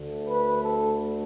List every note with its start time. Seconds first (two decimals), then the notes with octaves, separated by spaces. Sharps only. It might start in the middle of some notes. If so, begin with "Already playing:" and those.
Already playing: D2 D3 A3
0.28 B4
0.63 A4